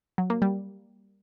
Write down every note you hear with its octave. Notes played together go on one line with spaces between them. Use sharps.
F#3
A#3
G3